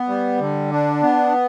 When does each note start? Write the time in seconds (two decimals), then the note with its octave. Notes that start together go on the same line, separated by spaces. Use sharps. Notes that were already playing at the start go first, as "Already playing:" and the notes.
Already playing: B3
0.08 G3
0.40 D3
0.72 D4
1.02 B3